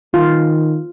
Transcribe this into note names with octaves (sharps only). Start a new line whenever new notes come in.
D#3 F4